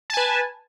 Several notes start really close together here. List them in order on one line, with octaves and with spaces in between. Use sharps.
A5 G#5 B4